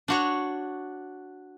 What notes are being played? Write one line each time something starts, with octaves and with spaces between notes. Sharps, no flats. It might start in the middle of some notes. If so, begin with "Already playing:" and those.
D4 F#4 C#5